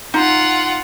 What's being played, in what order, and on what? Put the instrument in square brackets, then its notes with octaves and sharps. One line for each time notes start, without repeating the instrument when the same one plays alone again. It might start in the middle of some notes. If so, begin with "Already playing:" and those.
[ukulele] D#4 [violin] F4 F#5